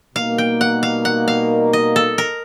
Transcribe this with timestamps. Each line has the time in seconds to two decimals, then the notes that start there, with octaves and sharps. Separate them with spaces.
0.15 B2 G3 A#3 D#4 F5
0.38 G5
0.61 F#5
0.83 F5
1.05 F#5
1.28 F5
1.73 D#5
1.96 A4
2.18 A#4